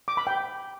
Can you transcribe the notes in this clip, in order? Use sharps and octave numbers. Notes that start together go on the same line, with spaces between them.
D6
B5
G5